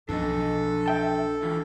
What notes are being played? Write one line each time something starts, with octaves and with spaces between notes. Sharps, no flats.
B1 F3 D4 A4 B4 D#5
E5 G5 A5
D3 E3 F4